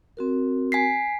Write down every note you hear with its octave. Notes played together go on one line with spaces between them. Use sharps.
C4 F#4 A#4
G#5 B6 C7